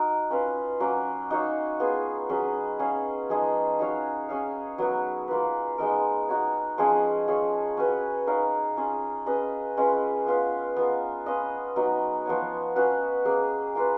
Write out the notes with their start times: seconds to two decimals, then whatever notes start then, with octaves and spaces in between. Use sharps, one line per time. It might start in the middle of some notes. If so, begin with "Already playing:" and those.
Already playing: D#4 F#4 A#4
0.30 C#4 F4 B4 F5
0.80 F#3 A#3 C#4 F#4
1.30 D#4 F#4 C#5 F5
1.80 B3 F4 G#4
2.29 F#3 C#4 G#4 B4
2.79 C#4 G#4 C#5 F5
3.30 F3 G#3 D#4 G#4
3.79 D#4 F#4 C#5 F5
4.29 C#4 G#4 C#5 F5
4.78 F#3 B3 F#4 A#4
5.28 A#3 F4 B4
5.78 G#3 B3 D#4 A#4
6.29 D#4 F#4 C#5
6.78 F3 G#3 C#4 G#4
7.27 C#4 F4 G#4 C#5
7.77 C#4 F#4 B4
8.27 D#4 A#4 C#5 F5
8.77 C#4 F4 G#4
9.26 C#4 G#4 B4 D#5
9.77 G#3 C#4 F4 B4
10.26 B3 F4 B4 F5
10.76 B3 F4 A#4
11.26 C#4 F4 B4 D#5
11.76 F#3 B3 D#4 F#4
12.26 F3 B3 F#4 C#5
12.75 C#4 F#4 B4 F5
13.25 A#3 C#4 G#4
13.75 A#3 F4 B4